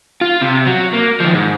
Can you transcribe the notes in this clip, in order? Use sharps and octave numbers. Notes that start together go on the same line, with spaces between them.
F4
C3
F#3
A#3
D#3 F3
G#2